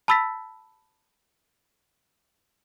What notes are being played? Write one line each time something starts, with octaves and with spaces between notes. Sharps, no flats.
A5 B5 E6 A6 B6